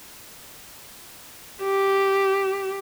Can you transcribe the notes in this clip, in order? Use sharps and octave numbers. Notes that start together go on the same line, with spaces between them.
G4